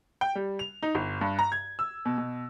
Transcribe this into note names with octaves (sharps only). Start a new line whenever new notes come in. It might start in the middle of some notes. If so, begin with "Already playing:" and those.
G5
G3
F7
D#4
G1
G2
A#5
G#6
E6
B2
B2